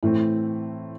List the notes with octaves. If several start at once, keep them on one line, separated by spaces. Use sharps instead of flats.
A2 E3 A3 C4